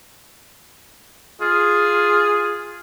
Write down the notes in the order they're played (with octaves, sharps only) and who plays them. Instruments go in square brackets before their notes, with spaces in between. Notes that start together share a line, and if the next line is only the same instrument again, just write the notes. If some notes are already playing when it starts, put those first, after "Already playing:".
[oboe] F4 [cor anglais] G#4